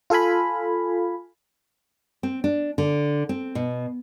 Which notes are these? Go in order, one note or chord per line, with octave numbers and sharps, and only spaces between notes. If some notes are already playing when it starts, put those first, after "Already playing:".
F4 A4 F5 G#5 B5
C4
D4
D3
C4
B2